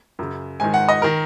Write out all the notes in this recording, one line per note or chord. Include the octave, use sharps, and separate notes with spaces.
F#2 C#3
G#2 D#3 G#5
F#5
D#5
D#3 A#4